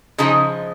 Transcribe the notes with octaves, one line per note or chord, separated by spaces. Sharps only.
C#3 F3 G#3 D#4 G#4